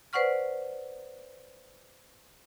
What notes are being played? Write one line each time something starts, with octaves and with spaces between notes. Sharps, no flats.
B4 C5 D5 F#5 C#6 F6